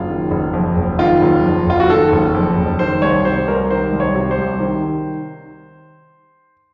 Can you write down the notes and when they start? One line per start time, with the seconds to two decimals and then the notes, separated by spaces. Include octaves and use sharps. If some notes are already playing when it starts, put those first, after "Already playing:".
Already playing: F#1 F4
0.08 D#3
0.31 F#1
0.53 F2
0.77 F#1
0.99 D#3 F4
1.21 F#1
1.44 F2
1.67 F#1 F4
1.80 F#4
1.89 D#3 A4
2.13 F#1
2.34 F2
2.58 F#1
2.79 D#3 C5
3.02 C2 C#5
3.24 C3 C5
3.48 C2 A#4
3.70 D#3 C5
3.93 C2
4.00 C#5
4.15 C3
4.31 C5
4.38 C2
4.60 D#3